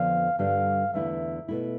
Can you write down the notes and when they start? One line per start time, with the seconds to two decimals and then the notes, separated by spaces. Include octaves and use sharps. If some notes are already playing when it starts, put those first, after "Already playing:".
Already playing: F2 D3 F3 B3 F5
0.39 G2 D3 G3 D4 F5
0.93 E2 D3 A3 E4 E5
1.48 B2 A3 E4